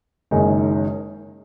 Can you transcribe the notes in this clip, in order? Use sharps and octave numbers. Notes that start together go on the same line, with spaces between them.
F#1 F#2 D#3 G#3 D#4